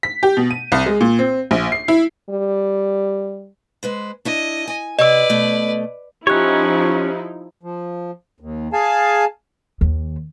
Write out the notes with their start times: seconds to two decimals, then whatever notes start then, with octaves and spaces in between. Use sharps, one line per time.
0.03 B6
0.23 G4
0.37 B2
0.51 D#7
0.72 C2
0.86 G#3
1.01 A#2
1.19 C4
1.51 A#1
1.72 C7
1.88 E4
2.30 G3
3.83 G#3 B4 C5
4.25 D4 E4 D#5
4.68 G#5
4.99 C3 B4 D5 D#5 E6
5.30 B2 A3
6.27 F3 C#4 D#4 E4 G4 C#5 F#6
7.63 F3
8.40 D#2
8.73 G#4 F5 G#5 A5
9.81 D#2